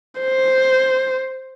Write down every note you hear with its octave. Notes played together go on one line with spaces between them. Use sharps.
C5